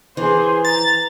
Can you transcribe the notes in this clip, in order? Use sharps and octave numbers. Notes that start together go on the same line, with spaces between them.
E3 G#4 C5
A#5 A6